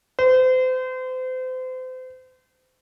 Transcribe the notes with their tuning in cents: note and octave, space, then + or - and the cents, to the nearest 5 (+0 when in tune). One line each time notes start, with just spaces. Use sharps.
C5 -35